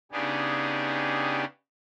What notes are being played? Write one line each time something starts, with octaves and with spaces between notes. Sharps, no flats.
C#3 B3 D4 D#4 G4 G#4